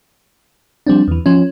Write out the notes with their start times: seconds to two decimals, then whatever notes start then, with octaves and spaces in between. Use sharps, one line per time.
0.87 F3 G3 C4 D4
1.08 E2 E3
1.26 F3 C#4